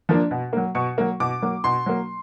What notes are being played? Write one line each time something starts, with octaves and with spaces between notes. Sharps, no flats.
F3 A#3 D4
B2
F#3 A#3
B2 C#6
F#3 A#3
B2 D6
F#3 A#3
B2 C6
F#3 A#3